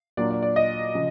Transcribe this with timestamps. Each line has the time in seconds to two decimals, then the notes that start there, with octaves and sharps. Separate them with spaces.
0.17 A#2 F#3 A#3 D4 F4 D5
0.30 D5
0.42 D5
0.56 D#5
0.95 C#3 F3